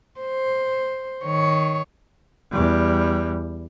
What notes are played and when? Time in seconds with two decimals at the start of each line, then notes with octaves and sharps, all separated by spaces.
0.20 C5
1.24 D#3 C#5
2.51 E2 G3